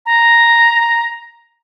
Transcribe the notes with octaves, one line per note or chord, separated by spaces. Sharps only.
A#5